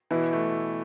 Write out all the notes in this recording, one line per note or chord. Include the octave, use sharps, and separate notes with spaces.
B2 E3 E4
A3